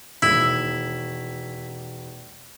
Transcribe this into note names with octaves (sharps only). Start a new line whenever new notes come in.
E1 D#2 E4